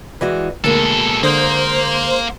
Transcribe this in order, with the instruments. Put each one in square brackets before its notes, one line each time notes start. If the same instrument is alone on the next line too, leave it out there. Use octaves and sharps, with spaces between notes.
[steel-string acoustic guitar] E3 G#3 F#4 [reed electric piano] B4 D5
[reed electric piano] D2 A#3 [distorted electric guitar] B2 A4 [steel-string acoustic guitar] G#3 A#4
[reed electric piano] D3 D#6 [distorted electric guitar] A#3 [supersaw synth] C5